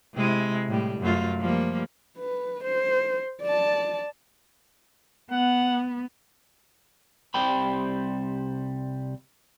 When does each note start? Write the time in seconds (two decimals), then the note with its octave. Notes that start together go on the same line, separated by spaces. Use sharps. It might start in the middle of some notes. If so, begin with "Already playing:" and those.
0.14 C3 G#3 E4
0.69 A2 G3
1.00 F#2 A3 F4
1.40 F3 G3 A#3
2.18 B4
2.64 C5
3.43 D5 A5
5.31 B3 F#5
7.34 C2 C3 G3 C5 G5 B5